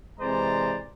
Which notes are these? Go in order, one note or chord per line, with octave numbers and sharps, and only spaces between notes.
C3 E3 G#3 C5 D5 A#5